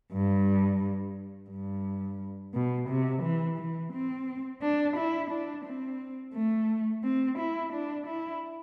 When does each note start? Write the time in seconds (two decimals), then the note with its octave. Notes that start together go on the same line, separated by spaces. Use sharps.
0.13 G2
1.50 G2
2.54 B2
2.89 C3
3.23 E3
3.58 E3
3.93 C4
4.62 D4
4.97 E4
5.31 D4
5.65 C4
6.34 A3
7.04 C4
7.38 E4
7.73 D4
8.07 E4